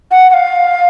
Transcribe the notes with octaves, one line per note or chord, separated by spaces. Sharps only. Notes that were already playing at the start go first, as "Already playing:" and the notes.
F#5
F#5
F5